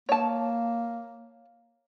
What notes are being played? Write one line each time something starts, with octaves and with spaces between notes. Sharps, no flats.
A#3 C#5 A5